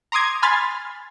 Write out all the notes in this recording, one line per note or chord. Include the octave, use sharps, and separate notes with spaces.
A#5 C6 D6 D#6 G#6
G#5 B5 C6 F6 G#6 A6